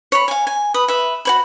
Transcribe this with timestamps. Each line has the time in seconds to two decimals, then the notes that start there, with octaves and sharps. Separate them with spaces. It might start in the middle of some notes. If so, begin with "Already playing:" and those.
0.12 C#5 B5
0.28 F5 G#5
0.47 G#5
0.74 B4 D#6
0.88 B4 E5
1.25 F#4 C#5 B5